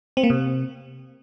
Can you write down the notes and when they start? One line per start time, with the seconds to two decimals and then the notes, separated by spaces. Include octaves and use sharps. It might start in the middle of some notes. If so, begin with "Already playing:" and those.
0.17 C4
0.23 A#3
0.30 C3